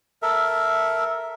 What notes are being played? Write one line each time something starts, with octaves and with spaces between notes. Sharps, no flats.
A4 A#4 E5